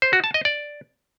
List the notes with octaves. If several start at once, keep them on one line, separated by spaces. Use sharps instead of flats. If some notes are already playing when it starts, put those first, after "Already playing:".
C5
F#4
A5
D#5
D5